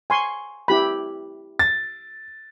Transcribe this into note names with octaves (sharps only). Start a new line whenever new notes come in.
G#5 C6 C#6
E4 G4 B5
A6